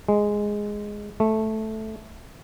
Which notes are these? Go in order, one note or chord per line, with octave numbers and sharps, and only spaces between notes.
G#3
A3